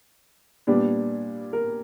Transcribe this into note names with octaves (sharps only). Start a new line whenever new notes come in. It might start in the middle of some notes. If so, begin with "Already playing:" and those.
A#2 G3 B3 D4
A#4